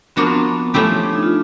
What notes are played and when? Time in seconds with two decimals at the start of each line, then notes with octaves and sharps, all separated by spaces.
0.16 F3 A#3 B3 D4 F#4
0.27 C4
0.74 F3 A3 C#4 E4 G4
1.03 D4
1.13 D#4
1.23 F4